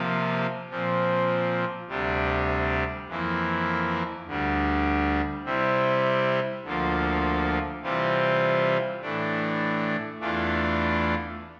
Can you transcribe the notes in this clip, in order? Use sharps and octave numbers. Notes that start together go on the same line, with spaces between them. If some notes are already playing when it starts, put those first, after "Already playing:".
Already playing: C3 F3 A#3 F4
A#2 F3 C4
D2 C3 G3 D4
F2 E3 A#3 E4
D2 D3 G3
C3 G3 C4 E4
D2 D3 F3 A#3 F4
C3 E3 G3 C4 F4
A2 E3 A3 D4
E2 E3 A3 D4 F4